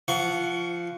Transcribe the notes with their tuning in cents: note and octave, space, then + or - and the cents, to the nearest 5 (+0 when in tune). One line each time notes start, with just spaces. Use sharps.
F3 -15 F#5 +0 C#6 +25